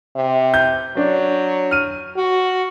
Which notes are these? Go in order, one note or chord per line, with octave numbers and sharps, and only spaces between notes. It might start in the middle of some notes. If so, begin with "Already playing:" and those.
C3
G6
F#3 D4
F6 D#7
F#4